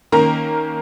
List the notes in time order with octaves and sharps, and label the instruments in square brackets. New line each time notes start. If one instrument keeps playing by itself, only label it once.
[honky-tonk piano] D#3 A#3 C#4 A#4 A#5